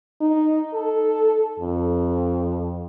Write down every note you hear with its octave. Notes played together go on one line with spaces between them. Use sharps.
D#4
A4
F2